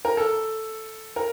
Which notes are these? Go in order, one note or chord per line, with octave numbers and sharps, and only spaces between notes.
A#4
A4
A#4